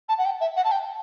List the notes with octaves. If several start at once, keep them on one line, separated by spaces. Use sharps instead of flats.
A5
F#5
G5
E5
F#5
A5
G5